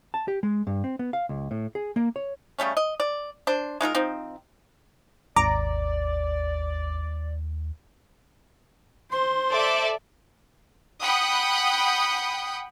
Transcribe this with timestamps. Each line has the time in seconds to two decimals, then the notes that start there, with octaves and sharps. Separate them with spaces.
0.14 A5
0.28 G4
0.43 G#3
0.67 G2
0.84 C4
0.99 B3
1.13 F5
1.29 C#2
1.51 A2
1.75 G#4
1.96 A#3
2.16 C#5
2.59 C#3 G3 A3 C#4
2.77 D#5
3.00 D5
3.47 D4 C5
3.81 G#3 D#4 F4 A#4
3.95 F3 C4 D#4
5.36 G#1 D#2 D5 A#5 D6
9.12 C5 C6
9.50 A4 D5 E5
11.01 F#5 G5 B5 D#6